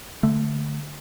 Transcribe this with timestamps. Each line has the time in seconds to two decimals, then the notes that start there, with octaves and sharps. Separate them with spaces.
0.23 D3 A3